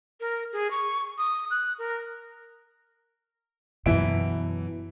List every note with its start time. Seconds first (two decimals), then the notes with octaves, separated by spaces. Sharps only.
0.20 A#4
0.53 G#4
0.71 C#6
1.18 D#6
1.51 F#6
1.79 A#4
3.86 F#2 B2 E3 E5 D7